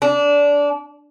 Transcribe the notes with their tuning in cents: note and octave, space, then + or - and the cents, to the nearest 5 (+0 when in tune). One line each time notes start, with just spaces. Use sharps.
D4 -20